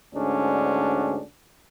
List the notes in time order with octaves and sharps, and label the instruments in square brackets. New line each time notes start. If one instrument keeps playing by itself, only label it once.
[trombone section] D2 G#2 C#4 D4